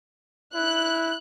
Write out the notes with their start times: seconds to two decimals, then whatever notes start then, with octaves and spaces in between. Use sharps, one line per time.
0.55 E4 F#6